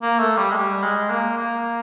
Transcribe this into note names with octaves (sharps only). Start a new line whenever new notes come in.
A#3
A3
G3
G#3
G3
G#3
A#3
A#3